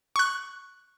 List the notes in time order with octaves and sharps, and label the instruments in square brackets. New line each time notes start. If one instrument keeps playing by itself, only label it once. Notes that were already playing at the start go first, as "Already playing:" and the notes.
[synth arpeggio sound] C#6 F#6